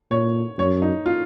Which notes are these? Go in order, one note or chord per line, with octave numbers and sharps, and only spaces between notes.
A#2 C#5
F#2 C#5
D#4
F4